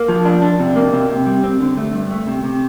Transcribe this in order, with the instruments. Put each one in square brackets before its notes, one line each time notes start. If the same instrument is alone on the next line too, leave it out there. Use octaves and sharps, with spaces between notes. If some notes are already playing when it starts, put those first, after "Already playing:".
Already playing: [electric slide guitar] A#3
F3
D4
D4
C3
A#3
C3
C3
G3
C4
D3
A3
G2
A3
C3
C3